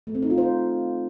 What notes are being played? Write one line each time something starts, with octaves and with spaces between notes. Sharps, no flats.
A3
C4
D#4
F4
C5